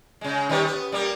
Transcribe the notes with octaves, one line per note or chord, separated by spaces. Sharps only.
C#3 G#3
D#3 G3 B3
B3
G3 A#3